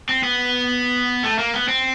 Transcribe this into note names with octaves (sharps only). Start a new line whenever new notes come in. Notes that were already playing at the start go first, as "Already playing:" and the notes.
C4
B3
A3
A#3
B3
C4